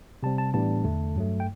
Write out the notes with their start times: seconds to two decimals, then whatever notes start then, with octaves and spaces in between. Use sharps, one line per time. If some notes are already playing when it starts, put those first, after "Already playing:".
0.23 C3 G3 C4 A5
0.38 A5
0.53 A2 E3 G3 B3 D4 A5
0.84 E2 D3 A3
1.15 G2 F#3 A3
1.40 G5